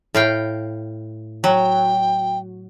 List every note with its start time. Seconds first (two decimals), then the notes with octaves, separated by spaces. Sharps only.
0.15 A2 F5 G5
1.44 F#3 G5